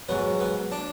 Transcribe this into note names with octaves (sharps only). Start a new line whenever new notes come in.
G#2 F#3 B3
B3
D4